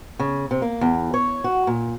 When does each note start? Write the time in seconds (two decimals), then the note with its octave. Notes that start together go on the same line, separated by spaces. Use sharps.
0.19 C#3
0.51 C3
0.62 A#3
0.81 E2
1.14 C#5
1.44 F#4
1.67 A#2